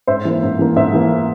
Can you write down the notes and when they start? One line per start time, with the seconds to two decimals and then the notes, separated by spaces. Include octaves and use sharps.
0.07 G#2 C5 E5
0.25 E3 A#3
0.43 G#2
0.59 E3 A#3
0.76 G#2 C5 E5
0.93 E3 A#3